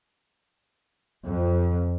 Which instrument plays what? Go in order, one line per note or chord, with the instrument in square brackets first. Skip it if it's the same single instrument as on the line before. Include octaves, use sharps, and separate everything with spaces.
[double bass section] F2